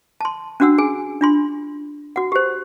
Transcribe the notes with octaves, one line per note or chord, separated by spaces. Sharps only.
A5 C6
C#4 D4 F#4 F#5 E6
G#4 G#5
D4 F4 C6
F#4 F#5
G4 C5